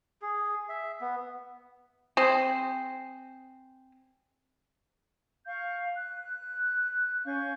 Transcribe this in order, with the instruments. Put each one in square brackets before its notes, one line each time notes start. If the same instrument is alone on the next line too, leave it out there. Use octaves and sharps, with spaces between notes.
[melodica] G#4
E5
B3
[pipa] C4 G#4 C5
[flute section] F5 C#6 G6
F#6
C#4 F5 C#6 G6